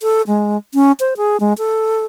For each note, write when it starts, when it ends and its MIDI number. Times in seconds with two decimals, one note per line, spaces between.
0.01 0.22 69
0.27 0.57 56
0.74 0.92 61
1.00 1.14 72
1.17 1.37 68
1.40 1.53 56
1.58 2.05 69